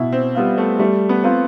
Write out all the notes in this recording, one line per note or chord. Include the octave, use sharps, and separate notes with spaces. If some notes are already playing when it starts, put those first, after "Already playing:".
Already playing: B2 E4
C4
G3 B3 F4
A3
G3 A3
B3
C4 F4 B4